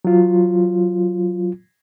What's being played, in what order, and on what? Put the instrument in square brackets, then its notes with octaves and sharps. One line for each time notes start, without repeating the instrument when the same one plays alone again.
[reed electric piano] F#3 F4